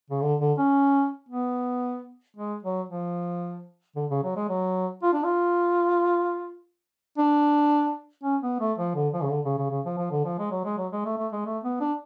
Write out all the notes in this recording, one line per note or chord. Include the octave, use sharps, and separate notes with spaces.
C#3
D3
D3
C#4
B3
G#3
F#3
F3
D3
C#3
F#3
G#3
F#3
F4
D4
F4
D4
C#4
B3
A3
F3
D3
F3
C#3
D3
C#3
C#3
C#3
F3
F3
D3
F3
G#3
F#3
G#3
F#3
G#3
A3
A3
G#3
A3
B3
D4